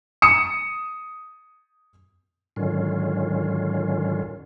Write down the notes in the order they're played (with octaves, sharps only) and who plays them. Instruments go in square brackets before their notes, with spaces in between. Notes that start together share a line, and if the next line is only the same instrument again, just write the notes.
[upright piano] D#6 C#7 E7
[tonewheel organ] G#2 D3 D#3 F#3 C#4 F4